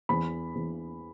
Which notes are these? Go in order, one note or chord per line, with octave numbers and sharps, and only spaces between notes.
E2 B5
E2